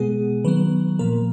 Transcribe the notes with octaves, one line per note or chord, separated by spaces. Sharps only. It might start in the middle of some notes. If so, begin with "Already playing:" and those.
Already playing: B2 G#3 B3 G#4
D#3 F#3 B3 B4
A#2 F3 A#3 A#4